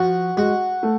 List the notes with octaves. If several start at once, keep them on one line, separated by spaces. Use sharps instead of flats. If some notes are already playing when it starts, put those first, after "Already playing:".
Already playing: F3 F#4
G#3 F#4
A3